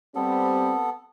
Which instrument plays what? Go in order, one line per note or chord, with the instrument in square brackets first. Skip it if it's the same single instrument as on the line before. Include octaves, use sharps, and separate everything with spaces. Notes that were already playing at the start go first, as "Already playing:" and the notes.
[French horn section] G3 C4 [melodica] B3 A4